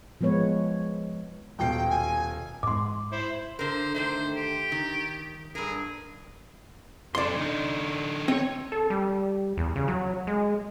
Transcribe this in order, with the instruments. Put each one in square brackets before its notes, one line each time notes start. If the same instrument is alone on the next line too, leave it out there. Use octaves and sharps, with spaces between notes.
[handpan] F3 G#3 B3 B4 C#5
[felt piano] D#1 B2 C7 [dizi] G5
[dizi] G#5
[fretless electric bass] G#2 G#3 [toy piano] C6 D6
[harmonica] E4 C5
[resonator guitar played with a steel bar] D3 A#4 [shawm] C5
[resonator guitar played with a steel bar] D3 D#3 A3 [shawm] C5
[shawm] G4
[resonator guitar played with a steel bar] D#3
[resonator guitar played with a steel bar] G2 A#4 [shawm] G#4
[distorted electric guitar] F#2 A4 [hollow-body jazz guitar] D5 C6
[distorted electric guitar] D3 D#4
[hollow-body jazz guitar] C4 [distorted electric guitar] C#5 D#5
[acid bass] A4
G3
E2
C#3
F#3
G#3